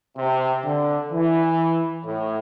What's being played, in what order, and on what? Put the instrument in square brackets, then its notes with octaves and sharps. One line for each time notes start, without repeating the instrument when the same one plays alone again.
[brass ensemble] C3
D3
E3
A2